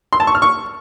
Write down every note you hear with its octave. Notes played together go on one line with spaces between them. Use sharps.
C6
A5
C#6
F6
C#6